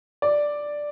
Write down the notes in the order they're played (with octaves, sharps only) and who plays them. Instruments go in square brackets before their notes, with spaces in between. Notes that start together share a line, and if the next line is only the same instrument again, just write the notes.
[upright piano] D5